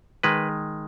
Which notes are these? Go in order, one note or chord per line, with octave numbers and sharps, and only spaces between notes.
D#3 G#3 B4